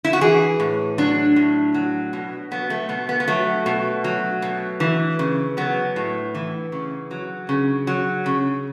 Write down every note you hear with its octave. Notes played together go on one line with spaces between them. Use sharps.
E4
F#4
E3 G#4
A2
F#3 D4
A2
F#3
B2
F#3 B3
A3
B2 B3
B3
B3
F#3 A3
B2
F#3
B2
E3
C#3
F#3 B3
A2
E3
C#3
F#3
C#3
F#3
C#3